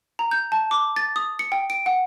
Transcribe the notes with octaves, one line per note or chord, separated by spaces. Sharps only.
A#5
G6
A5
D6
A6
D#6
C#7
G5
D7
F#5